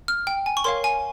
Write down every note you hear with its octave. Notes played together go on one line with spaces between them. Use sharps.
F6
G5
G#5
C#6
A#4 C#5 F5 C6
G#5